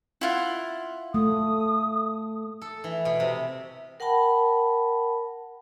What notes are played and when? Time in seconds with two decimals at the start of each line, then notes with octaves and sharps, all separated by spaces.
0.21 E4 F4 F#5
1.14 A3 D#6
2.61 A4
2.84 E3
3.05 B2
3.20 C3
4.00 A#4 F#5 G5 A5 B5